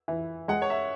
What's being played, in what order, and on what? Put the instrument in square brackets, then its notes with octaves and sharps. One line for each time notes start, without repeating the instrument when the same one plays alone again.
[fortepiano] E3
[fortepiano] G#3 [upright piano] F#5
[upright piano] C#5
E5